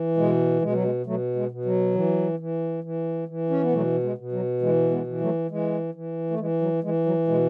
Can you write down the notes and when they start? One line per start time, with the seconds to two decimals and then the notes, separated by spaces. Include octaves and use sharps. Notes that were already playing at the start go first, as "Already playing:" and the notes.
Already playing: E3
0.17 B2 G#3
0.62 B2 G#3
0.72 F#3
0.84 G#3
1.06 B2 F#3 A3
1.36 G#3
1.51 B2
1.65 F#3
1.95 E3
2.39 E3
2.84 E3
3.28 E3
3.50 C#4
3.62 B3
3.73 B2 F#3 A3
4.03 G#3
4.18 B2
4.32 F#3
4.62 E3 G#3
4.91 G#3 B3
5.07 E3
5.21 F#3 A3
5.51 E3 G#3
5.94 E3
6.31 A3
6.39 E3 G#3
6.61 F#3
6.83 E3 G#3
7.06 F#3
7.28 B2 G#3